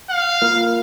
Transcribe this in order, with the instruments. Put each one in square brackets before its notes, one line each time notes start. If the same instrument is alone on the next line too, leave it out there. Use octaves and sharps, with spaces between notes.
[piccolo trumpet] F5
[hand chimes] A#3 F4 A#4